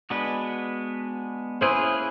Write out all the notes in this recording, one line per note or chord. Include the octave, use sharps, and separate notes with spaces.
G#3 B3 D4 F#4 B4
A#3 C#4 E4 G#4 B4 C5